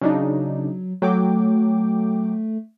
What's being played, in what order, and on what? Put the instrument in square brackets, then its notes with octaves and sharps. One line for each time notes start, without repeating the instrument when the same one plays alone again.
[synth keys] C#3 D4 D#4 [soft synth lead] F#3
[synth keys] F#3 G5 D6 [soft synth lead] A3